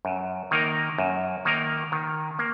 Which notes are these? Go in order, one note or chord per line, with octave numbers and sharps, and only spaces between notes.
F#2
D#3 A#3 D#4 A#4
F#2
D#3 A#3 D#4 A#4
D#3
A#3